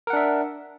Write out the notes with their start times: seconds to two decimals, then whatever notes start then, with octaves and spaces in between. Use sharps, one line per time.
0.07 A#4
0.10 F#5
0.13 D4
0.16 E5